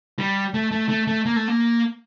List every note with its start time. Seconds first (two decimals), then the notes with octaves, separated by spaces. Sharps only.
0.19 G3
0.54 A3
0.72 A3
0.89 A3
1.07 A3
1.26 A#3
1.36 A3
1.48 A#3